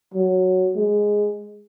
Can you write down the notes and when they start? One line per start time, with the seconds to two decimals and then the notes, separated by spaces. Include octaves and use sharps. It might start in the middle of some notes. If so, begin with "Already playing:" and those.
0.14 F#3
0.76 G#3